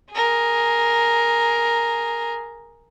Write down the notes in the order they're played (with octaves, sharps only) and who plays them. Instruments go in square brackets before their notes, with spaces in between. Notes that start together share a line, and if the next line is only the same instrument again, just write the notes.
[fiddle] G#4 A#4